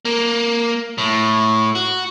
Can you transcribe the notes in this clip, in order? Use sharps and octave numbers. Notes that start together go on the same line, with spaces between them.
A#3
A2
F#4